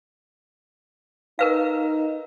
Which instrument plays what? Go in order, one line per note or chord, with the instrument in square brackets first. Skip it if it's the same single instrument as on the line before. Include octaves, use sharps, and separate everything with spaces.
[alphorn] D#4 [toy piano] A#4 B4 F5